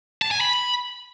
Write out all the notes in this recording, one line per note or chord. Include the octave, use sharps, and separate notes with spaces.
A5
G#5
B5